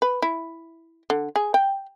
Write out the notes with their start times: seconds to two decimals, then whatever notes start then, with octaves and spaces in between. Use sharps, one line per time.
0.02 B4
0.22 E4
1.10 D3
1.36 G#4
1.54 G5